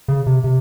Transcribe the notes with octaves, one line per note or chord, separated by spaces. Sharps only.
C#3
C3
C3